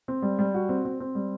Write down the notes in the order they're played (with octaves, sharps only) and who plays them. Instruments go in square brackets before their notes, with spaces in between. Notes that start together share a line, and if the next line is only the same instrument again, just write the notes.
[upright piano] C4
G3
G3
F#4
C4
C4
C4
G3